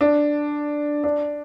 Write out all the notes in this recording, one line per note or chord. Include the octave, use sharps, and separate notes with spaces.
D4
D4